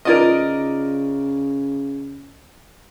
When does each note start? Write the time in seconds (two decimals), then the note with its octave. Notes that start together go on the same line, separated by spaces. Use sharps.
0.05 C#3 D#4 F4 A#4 B4 D5 D#5